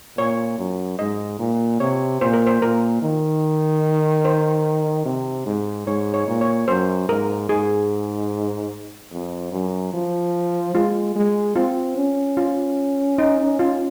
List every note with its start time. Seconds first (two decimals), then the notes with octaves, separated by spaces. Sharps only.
0.17 A#2 C#5
0.58 F#2
0.99 G#2 D#5
1.39 A#2
1.80 C3 C#5
2.21 A#2 C5
2.33 A#4
2.47 C5
2.62 A#2 A#4
3.02 D#3
4.25 C5
5.05 C3
5.46 G#2
5.87 G#2 C#5
6.14 C#5
6.28 A#2
6.41 C#5
6.68 F#2 C5
7.09 G#2 A#4
7.49 G#2 G#4
9.12 F2
9.52 F#2
9.93 F3
10.74 G#3 F4
11.15 G#3
11.56 C4 F4
11.97 C#4
12.37 F4
13.18 D#4
13.59 F4